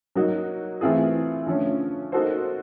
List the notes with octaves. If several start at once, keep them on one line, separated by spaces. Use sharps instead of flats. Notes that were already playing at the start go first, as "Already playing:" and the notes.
F#3 A#3 D#4 F#4
E3 A3 C4 F4 G#4
D3 F3 A3 C#4
A#3 D#4 F#4 A4 C5